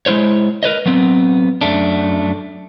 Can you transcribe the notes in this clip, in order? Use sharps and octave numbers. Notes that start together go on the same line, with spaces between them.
G#3 B3 E4 C5 C#5
A#4 B4 C#5 D#5
F#3 B3 C4
F#2 A3 D4